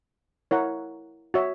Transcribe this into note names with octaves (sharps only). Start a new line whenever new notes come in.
E4 A#4 C#5 F#5
F#4 C#5 E5